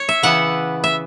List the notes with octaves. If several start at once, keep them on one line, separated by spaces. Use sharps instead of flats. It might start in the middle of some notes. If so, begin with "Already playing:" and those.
Already playing: C#5
E5
C#3 E3 B3 F#5
E5